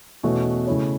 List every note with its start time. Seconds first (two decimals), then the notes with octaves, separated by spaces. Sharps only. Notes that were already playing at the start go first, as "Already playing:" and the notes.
0.23 E2 B2 A3 C#4 F#4
0.67 C#3 A3 E4 C#5